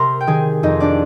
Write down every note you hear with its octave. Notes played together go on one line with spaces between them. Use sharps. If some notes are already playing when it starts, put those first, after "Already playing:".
Already playing: C3 A#4 A#5 C6
G5
D#3 G#4 G#5
F2 D#4 D#5
D4 D5